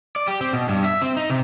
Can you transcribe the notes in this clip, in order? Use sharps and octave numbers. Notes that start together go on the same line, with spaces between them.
D5
G4
C4
B2
G2
E5
C4
D#4
C3